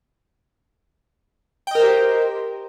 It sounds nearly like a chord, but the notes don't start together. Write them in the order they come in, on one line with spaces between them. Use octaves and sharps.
G5 D#5 A#4 C5 G4